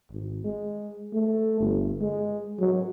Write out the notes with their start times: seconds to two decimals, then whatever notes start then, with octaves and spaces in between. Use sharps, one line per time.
0.11 G#1
0.45 G#3
1.13 A3
1.60 G1
2.01 G#3
2.60 F#3